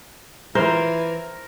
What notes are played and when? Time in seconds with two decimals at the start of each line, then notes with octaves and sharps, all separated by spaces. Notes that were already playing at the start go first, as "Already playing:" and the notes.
0.55 E3 A#4 C5